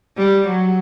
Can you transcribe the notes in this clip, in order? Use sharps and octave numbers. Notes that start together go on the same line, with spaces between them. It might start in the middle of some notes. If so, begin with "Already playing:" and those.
G3
F#3